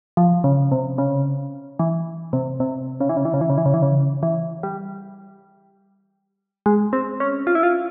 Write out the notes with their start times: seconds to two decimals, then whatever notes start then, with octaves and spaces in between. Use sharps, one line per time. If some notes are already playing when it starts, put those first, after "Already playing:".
0.17 F3
0.44 C#3
0.72 C3
0.98 C#3
1.79 E3
2.33 C3
2.60 C3
3.01 C#3
3.09 E3
3.17 C#3
3.25 E3
3.34 C#3
3.41 E3
3.50 C#3
3.58 E3
3.66 C#3
3.74 E3
3.82 C#3
4.23 E3
4.63 G3
6.66 G#3
6.93 C4
7.20 C#4
7.47 F4
7.55 E4
7.63 F4